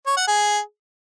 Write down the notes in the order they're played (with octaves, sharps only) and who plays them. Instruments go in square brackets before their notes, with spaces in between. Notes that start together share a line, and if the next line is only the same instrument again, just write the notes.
[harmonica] C#5
F#5
G#4